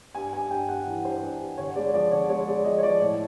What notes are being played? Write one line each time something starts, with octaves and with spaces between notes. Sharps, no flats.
G2 G#5
G2 G#5
G2 G5
G2 F#5
E3
G2 C5
G2
G2
D3 C#5
G#3 D5
C#5
F3 D5
D3 C#5
G#3 C#5
G#3 D5
F3 D#5
C#5
F3 D5
A2 C#5